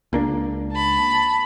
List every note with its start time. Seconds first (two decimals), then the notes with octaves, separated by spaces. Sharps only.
0.13 C#2 A#3 D4
0.72 A5 B5